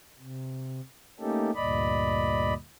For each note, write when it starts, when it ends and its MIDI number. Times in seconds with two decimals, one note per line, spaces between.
0.19 0.81 48
1.19 1.51 57
1.19 1.51 58
1.19 1.51 61
1.19 1.51 63
1.19 1.51 67
1.19 1.51 69
1.55 2.54 38
1.55 2.54 43
1.55 2.54 46
1.55 2.54 74
1.55 2.54 75
1.55 2.54 83